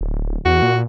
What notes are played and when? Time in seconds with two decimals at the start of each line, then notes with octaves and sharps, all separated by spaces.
0.01 D1
0.45 E2 F#4
0.62 A#2